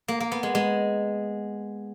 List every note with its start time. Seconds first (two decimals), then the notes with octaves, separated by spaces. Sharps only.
0.08 A#3
0.20 A#3
0.32 B3
0.43 G#3
0.55 G#3